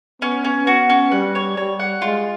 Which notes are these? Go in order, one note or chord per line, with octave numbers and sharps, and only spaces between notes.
B3 C#4
C#4
B3 F#4
C#4
G3 F#5
C#5
G3 C#5
F#5
G#3 F4